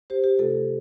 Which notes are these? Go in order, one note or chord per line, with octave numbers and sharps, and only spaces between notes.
G4 C5
G4
C3 A3 F4 A4